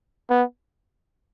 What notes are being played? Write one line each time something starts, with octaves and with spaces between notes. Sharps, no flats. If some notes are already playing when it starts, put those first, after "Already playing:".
B3